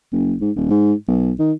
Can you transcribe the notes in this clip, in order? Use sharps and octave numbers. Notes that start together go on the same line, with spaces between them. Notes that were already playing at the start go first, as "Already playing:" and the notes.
F#1
G#2
D#1
G#2
B1
D#3